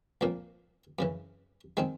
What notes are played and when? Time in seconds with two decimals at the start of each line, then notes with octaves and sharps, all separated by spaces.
0.21 C2 A#2 F3 A#3
0.99 F#2 C#3 E3
1.77 D#3 G#3 C4 D#4